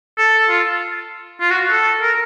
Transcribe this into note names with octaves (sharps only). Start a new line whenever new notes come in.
A4
F4
F4
F#4
A4
A#4